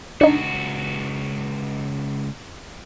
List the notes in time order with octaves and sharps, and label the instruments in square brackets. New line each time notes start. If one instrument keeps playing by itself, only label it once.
[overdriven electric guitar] C#2 F#4 [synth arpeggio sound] D4 D#4